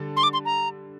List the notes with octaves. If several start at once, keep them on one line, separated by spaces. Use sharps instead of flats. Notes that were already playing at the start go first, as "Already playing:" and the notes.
Already playing: D3 G3 A4
C6
D6
C6
A#5